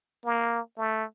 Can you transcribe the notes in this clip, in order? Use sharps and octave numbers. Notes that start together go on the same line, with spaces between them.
A#3
A3